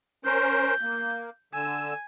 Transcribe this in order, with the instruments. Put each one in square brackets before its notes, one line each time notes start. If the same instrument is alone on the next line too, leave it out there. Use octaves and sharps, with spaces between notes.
[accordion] C#4 A#4 C5 [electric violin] G6
[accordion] A#3
[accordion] D3 E6 [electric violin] G#5